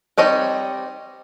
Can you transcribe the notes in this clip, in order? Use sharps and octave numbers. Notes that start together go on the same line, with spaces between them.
G3 C4 D#4 C#5 D#5